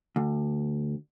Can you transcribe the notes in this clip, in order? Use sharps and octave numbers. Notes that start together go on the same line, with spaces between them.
D2